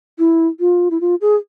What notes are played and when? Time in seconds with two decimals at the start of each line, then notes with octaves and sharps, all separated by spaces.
0.19 E4
0.60 F4
0.91 E4
1.01 F4
1.21 G#4